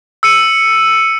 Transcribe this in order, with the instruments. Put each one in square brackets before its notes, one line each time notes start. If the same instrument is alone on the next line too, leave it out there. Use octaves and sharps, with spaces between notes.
[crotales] E6 C#7 D#7